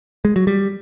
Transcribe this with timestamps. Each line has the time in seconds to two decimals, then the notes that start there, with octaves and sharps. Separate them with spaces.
0.25 G#3
0.36 F#3
0.47 G3